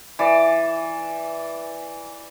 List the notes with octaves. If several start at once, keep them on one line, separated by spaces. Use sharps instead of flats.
E3 D5